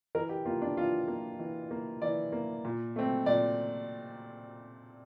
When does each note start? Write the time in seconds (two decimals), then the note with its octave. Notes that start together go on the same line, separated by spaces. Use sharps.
0.15 E3 A#4
0.29 G4
0.45 A#3 F4
0.62 D4
0.77 E3 F4
1.08 A#3
1.39 E3
1.71 A#3
2.02 E3 D5
2.32 A#3
2.65 A#2
2.96 A3 C4
3.26 A#2 D5